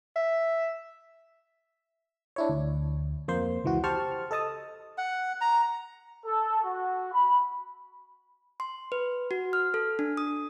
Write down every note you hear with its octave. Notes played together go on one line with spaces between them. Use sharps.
E5
D4 E4 C#5
D2
F2 A#3 C5 C6
C#2 E3 F#4
G4 C5 A5 C#6 F6
A4 D#5 A5 D#6
F#5
A#5
A4
F#4
B5
C6
B4
F#4
F6
A4
D4
D#6